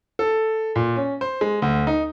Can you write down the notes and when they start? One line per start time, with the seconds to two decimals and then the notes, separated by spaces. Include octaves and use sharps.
0.19 A4
0.76 A#2
0.96 C#4
1.21 C5
1.41 G#3
1.62 D2
1.87 D#4